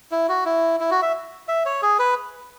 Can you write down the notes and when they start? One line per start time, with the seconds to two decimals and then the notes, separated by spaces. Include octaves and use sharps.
0.12 E4
0.29 F#4
0.45 E4
0.80 E4
0.91 F#4
1.02 E5
1.48 E5
1.66 C#5
1.82 G#4
1.99 B4